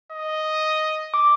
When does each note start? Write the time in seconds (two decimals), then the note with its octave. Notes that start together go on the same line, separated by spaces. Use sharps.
0.12 D#5
1.14 D6